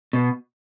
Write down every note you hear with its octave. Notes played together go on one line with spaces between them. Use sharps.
B2